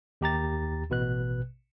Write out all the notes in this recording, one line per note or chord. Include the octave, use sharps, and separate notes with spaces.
D#2 G4 A#5 A6
A1 B2 B4 F#6